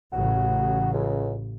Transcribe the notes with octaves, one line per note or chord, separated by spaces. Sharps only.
A1 C#3 F#4
C#2